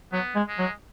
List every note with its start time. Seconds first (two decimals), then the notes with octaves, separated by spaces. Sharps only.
0.12 F#3 B3
0.35 G#3
0.47 G#3
0.59 F#3